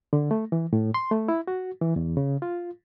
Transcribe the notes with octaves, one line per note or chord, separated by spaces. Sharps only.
D3
A3
E3
A2
C6
A3
E4
F#4
E3
E2
C#3
F4